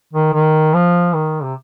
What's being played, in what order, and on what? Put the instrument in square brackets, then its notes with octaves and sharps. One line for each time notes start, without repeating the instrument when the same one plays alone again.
[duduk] D#3
D#3
F3
D#3
C3